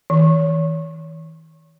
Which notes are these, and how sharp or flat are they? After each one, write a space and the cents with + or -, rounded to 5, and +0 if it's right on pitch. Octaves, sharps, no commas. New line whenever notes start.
E3 -45